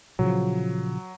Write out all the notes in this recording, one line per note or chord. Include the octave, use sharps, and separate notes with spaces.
A#2 C#3 F3 F#3